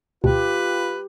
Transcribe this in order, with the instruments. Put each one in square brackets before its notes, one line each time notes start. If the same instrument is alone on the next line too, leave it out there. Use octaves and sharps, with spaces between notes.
[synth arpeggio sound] D2 B2 [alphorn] F4 [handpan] G4 [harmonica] B4